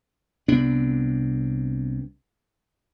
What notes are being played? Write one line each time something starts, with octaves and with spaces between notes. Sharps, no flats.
C2 C3 B3 D4